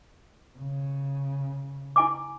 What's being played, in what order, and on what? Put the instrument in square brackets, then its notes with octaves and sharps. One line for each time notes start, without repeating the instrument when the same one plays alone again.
[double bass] C#3
[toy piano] E4 G#5 D6